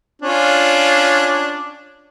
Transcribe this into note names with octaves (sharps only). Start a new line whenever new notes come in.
C#4 D4 F4